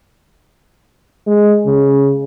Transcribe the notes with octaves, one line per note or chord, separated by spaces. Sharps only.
G#3
C#3